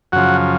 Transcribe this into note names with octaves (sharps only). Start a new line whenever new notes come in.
F#2 C#3 F3 F#4